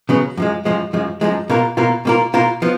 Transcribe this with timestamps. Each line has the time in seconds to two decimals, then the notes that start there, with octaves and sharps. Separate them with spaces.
0.09 C#3 F#3 B3
0.37 F#2 F3 G#3
0.65 F#2 F3 G#3
0.93 F#2 F3 G#3
1.21 F#2 F3 G#3
1.50 B2 A#3 F4 A#4
1.77 B2 A#3 F4 A#4
2.05 B2 A#3 F4 A#4
2.34 B2 A#3 F4 A#4
2.62 F3 B3